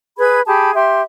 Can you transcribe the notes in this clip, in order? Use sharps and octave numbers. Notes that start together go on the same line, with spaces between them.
G#4 B4 B5 G#6
G4 G#4 A5 B5
G4 E5 C6